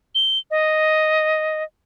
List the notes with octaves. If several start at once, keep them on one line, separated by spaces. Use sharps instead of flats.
G7
D#5